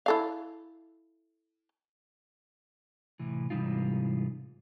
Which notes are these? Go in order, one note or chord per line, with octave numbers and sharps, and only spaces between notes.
E4 A4 F5
A2 C3 E3
G#2 C3 E3 G3 D#4 F4